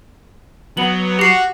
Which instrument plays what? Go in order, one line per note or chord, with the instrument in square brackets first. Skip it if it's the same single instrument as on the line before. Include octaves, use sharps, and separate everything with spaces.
[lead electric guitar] F#3 [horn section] B3 [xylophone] F#7
[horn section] F#4 [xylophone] G4 C7